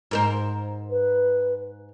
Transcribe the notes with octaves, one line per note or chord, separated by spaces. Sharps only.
G#2 A#4 C5
B4